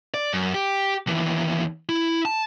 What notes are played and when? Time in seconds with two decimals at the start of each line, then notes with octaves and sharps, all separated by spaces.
0.14 D5
0.34 F#2
0.54 G4
1.07 D#2 E3
1.89 E4
2.25 A5